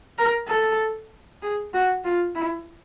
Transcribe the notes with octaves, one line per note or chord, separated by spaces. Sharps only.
A#4
A4
G#4
F#4
F4
E4